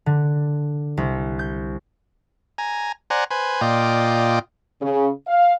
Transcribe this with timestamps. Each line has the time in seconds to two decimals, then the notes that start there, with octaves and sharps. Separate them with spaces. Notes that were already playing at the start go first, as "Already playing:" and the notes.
0.06 D3
0.97 C2
1.39 G6
2.58 G#5 A#5
3.10 C5 D5 F#5 G#5 A#5
3.31 B4 C5 G#5
3.61 A#2 F4 D5 D#5 G5
4.81 C#3
5.27 F5